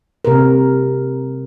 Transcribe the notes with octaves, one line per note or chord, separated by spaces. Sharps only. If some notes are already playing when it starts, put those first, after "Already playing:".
C3 A#4